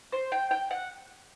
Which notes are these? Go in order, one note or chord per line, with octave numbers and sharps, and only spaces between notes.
C5
G5
G5
F#5